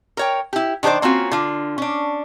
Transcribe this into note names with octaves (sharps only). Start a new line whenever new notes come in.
A#4 C#5 G5
E4 G4
D#3 D4 G#4 C5 D5
A#3 C4 C#4 F4 F#4
D3 F4
C#4 D4